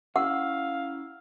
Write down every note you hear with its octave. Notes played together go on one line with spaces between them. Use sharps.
C#4 E4 F5 F#5 E6